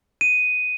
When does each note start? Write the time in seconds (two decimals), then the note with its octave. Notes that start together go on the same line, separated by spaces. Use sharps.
0.21 D#7